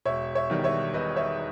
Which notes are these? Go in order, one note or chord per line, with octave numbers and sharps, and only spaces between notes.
E1 C#5 E5
C#5 E5
E2 D#3 G3
C#5 E5
E1 B4 D#5
C#5 E5